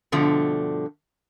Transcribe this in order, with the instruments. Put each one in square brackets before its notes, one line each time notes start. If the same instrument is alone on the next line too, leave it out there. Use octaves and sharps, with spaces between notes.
[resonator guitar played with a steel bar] G2 B2 D3 F3 A3